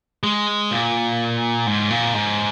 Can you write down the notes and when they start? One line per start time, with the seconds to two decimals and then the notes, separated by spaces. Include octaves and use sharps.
0.23 G#3
0.71 A#2
1.67 G#2
1.90 A#2
2.14 G#2